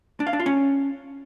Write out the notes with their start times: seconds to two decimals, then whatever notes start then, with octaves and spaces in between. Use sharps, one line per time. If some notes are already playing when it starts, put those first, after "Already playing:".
0.20 D4
0.27 F5
0.33 D4
0.40 F4
0.46 C#4